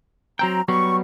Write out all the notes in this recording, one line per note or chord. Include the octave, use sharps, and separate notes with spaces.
F#3 C4 G5 A#5
F#3 G3 B3 C#6